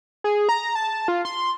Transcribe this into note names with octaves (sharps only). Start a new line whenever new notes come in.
G#4
A#5
A5
F4
C6